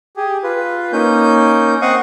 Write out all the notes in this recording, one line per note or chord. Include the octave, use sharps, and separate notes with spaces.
G4 G#4
F4 B4
A#3 C#4 D#4 G6
C4 D#5 F5 F#5 C#6 D#6